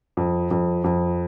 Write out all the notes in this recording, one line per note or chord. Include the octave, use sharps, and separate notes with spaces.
F2
F2
F2